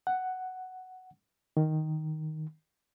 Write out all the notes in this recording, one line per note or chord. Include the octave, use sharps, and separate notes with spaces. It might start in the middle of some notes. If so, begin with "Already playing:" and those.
F#5
D#3